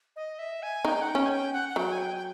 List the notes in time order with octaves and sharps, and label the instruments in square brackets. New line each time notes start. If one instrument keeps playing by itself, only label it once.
[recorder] D#5
E5
G#5
[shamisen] D#4 [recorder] G5
[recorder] F#5
G5
[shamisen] C#4
[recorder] G#5
G5
F#5
F#5
[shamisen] F#3 [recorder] G5
[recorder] G#5
G5
G5